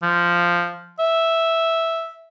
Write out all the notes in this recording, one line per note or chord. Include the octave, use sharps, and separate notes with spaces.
F3
E5